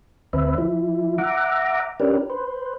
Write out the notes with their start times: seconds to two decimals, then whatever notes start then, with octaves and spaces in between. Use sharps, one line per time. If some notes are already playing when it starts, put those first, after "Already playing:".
0.33 D2 C4 B4 E5
0.58 F3 E4
1.18 E5 F#5 A#5 D6
2.00 C#4 D4 G4 A#4 B4
2.30 B4 C5